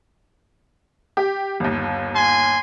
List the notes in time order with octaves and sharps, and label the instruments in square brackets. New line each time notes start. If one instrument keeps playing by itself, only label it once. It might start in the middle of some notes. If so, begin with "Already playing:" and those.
[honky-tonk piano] G4
G1 D#2
[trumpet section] G#5 C6